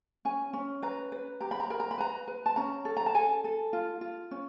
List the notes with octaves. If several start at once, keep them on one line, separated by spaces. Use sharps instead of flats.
C#4 G#5
C#4
B4 A#5
B4
G4 A#5
B5
A#5
A#4 B5
A#5
B5
B4 A#5
B4
A5
C#4 A#5
A4
A#5
A5
A4 G#5
A4
F4
F4
C#4